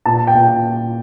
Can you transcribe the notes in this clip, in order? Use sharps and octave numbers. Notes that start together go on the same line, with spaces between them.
A#2 A5
G5
A#2